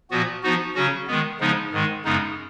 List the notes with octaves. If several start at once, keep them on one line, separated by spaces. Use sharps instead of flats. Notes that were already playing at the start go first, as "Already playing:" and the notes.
A#2 F3 B3 F#4
F3 B3 D#4 F#4
C#3 F#3 C#4 F#4
D#3 G#3 B3
C#3 F3 G#3 B3 D#4
G#2 D#3 G#3
F#2 C#3 G#3 B3 D#4